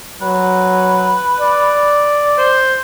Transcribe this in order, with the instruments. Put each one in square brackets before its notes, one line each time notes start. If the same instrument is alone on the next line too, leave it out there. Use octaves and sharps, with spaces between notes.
[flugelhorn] F#3 [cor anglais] B4
[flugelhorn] D5
[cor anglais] C5